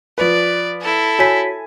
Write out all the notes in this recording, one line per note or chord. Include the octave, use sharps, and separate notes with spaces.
F3 B4 D5
E4 A4
F#4 C#5 G#5 B6